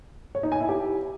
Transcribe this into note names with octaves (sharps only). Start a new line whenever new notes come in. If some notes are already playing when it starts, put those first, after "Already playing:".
C#5
D#4
G#5
E4
G4